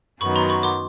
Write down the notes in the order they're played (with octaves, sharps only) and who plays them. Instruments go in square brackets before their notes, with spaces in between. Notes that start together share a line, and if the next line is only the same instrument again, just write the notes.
[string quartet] F#2 D#3 F#3 B3 [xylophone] B5 C#6
[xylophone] A#5 C6
B5 C#6
C6 D6